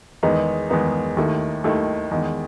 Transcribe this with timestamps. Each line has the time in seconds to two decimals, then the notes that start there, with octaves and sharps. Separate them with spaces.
0.23 E2 D#3 G#3 B3 D#4
0.70 E2 D#3 G#3 B3 D#4
1.17 D#2 D#3 A3 E4
1.64 D#2 D#3 A3 E4
2.11 E2 D#3 G#3